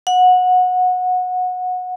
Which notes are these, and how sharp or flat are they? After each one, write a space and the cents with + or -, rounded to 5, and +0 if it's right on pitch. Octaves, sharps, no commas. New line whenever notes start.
F#5 -20